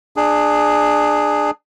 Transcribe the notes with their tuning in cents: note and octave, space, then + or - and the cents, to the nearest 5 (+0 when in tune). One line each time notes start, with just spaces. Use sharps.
D4 +25 G#4 +0